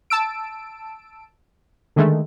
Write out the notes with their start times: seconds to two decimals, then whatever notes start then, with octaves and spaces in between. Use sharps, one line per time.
0.10 A5 E6 D7
1.96 D3 D#3 G#3 A3